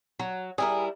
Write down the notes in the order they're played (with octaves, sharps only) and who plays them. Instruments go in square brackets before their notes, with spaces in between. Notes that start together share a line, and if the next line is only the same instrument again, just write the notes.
[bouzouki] F#3
[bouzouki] G3 E4 A#4 [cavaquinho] G#4